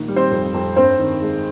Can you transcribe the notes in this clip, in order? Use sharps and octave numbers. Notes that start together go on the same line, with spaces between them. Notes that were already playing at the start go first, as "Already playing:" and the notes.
Already playing: A#1 D#3
G3
C4 C5
F2
F2
G2 C4 C5
D#3
G#3